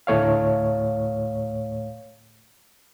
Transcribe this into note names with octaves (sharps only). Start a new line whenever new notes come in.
D2 A2 A3 C#5 F5